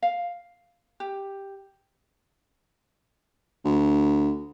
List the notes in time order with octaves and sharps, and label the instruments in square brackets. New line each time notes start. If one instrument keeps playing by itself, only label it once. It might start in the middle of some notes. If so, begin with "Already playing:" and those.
[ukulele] F5
G4
[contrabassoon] D2